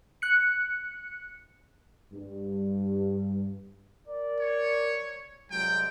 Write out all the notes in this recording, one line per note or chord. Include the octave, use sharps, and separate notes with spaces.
F#6 C#7
G2
A#4 D5
C#5
C2 F#3 G#3 G5